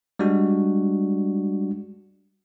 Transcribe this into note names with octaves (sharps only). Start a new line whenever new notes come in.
G3 G#3 D4 F#4